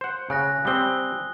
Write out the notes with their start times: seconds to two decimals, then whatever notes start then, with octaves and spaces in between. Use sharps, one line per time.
0.01 C5 F#5
0.30 C#3 G#5 F#6 A#6
0.65 G3 C4 D#6 G7